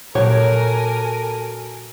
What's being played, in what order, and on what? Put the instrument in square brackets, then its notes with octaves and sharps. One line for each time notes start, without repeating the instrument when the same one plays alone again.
[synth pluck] A#2 [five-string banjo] F#3 G4 C#5 [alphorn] A4 [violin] A#4 G#5